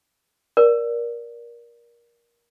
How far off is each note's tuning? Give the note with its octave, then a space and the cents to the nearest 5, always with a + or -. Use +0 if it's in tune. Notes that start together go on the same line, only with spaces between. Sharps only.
A#4 +20 D5 +0